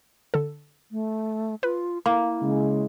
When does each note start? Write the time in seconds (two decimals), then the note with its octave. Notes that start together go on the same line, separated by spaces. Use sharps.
0.34 D3 A4
0.91 A3
1.63 F4 B4
2.06 A#3 E4 A#5
2.41 C#3 G#3